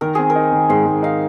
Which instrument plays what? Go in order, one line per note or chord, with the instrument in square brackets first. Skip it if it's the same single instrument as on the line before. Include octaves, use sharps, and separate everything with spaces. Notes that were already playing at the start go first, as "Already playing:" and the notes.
[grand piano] D#3 [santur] A#4
[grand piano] C4 [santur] G#4
[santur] A#4
[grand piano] D#4
D#3
[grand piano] G#2 [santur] C5
[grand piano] G#2
[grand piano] D#4 [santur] F5